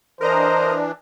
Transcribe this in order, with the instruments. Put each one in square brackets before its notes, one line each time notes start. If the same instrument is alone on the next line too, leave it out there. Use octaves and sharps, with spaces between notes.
[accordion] E3 D4 [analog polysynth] A#4 D#5 A#5 [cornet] C5